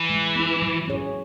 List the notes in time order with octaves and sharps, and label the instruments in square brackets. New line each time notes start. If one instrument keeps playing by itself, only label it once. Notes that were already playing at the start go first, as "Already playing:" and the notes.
Already playing: [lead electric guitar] E3
[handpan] G#3
B3 E4
F#3
C#4 G#4 C#5